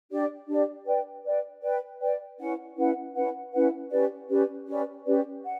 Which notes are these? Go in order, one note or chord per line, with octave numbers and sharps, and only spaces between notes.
D4 G4 D5
D4 G4 D5
B4 D5 G5
B4 D5 G5
B4 D5 G5
B4 D5 G5
C#4 E4 B4 F#5
C#4 E4 B4 F#5
C#4 E4 B4 F#5
C#4 E4 B4 F#5
C#4 G4 B4 D5
C#4 G4 B4 D5
C#4 G4 B4 D5
C#4 G4 B4 D5
F#5